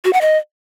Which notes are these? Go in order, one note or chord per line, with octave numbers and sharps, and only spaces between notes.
F#4
F#5
D#5